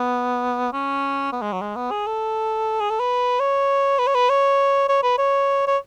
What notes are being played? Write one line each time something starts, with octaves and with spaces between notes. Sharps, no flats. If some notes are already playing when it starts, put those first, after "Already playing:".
Already playing: B3
C#4
B3
G#3
F#3
G#3
B3
G#4
A4
G#4
A4
B4
C#5
B4
C#5
B4
C#5
C#5
B4
C#5
C#5